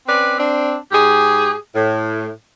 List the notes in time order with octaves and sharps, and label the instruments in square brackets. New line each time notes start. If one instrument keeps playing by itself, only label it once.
[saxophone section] C4 C#4 B4 D5
C4 D4
G#2 G4 G#4
A2